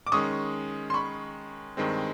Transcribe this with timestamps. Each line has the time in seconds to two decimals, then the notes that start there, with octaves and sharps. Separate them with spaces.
0.07 D6
0.12 D#3 G#3 C#4 C#6 D#6
0.90 C6
0.94 B5 C#6
1.77 G2 D#3 G#3 C4